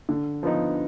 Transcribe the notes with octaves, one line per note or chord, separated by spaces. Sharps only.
D3
F3 B3 D#4